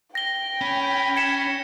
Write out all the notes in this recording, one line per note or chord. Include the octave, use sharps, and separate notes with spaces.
G5 A#6 G7
C#4 B5
G#6 C#7 E7